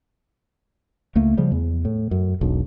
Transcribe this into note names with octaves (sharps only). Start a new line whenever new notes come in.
C#2 A3 A#3
C#3 F3 G3
E2
A2
F#2
E1 B1